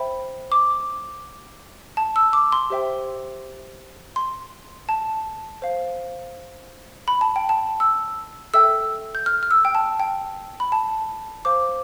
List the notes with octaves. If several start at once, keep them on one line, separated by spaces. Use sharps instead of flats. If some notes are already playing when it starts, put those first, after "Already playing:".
Already playing: C5 E5 G5 B5
D6
A5
E6
D6
C6
G4 C5 E5 G5
C6
A5
C5 F5
B5
A5
G5
A5
E6
A4 E5 G5 E6
G6
F6
F6
E6
G5
A5
G5
B5
A5
C5 F5 D6